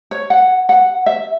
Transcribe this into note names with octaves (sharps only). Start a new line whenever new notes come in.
C#5
F#5
F#5
E5